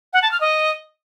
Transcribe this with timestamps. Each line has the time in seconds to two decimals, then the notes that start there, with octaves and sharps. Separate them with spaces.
0.13 F#5
0.22 A5
0.31 F6
0.41 D#5